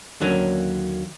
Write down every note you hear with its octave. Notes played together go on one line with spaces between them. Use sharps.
D#2 D3 F#3 A#3 C#4